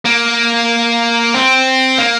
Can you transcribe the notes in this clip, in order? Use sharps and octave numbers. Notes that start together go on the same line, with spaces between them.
A#3
C4
A#3